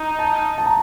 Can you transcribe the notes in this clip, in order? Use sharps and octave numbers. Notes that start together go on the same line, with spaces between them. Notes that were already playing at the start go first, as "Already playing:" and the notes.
Already playing: D#4
A5
A5
A#5